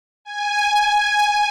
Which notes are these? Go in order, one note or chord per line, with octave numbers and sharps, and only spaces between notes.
G#5